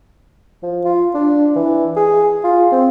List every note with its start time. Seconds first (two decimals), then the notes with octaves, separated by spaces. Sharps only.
0.63 F3
0.85 F4
1.14 D4
1.56 E3
1.96 G#4
2.44 F4
2.72 C4